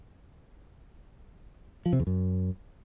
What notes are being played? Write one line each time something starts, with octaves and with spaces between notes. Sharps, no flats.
F3
C3
E2
F#2